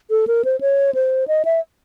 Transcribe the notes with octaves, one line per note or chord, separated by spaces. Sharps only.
A4
A#4
C5
C#5
C5
D#5
E5